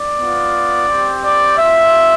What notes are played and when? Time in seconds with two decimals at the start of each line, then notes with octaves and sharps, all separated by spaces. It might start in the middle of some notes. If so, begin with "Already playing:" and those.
Already playing: D5
0.19 B3 F4
0.88 C4 G4
1.23 D5
1.57 C4 F4 E5